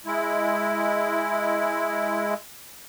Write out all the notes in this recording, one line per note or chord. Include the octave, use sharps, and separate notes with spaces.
G#3 E4